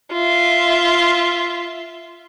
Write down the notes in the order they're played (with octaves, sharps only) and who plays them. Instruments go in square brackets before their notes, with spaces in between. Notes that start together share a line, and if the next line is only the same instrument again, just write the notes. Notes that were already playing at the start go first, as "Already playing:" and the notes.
[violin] F4 E5